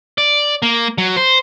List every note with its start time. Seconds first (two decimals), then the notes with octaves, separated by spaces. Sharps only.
0.18 D5
0.62 A#3
0.98 F#3
1.16 C5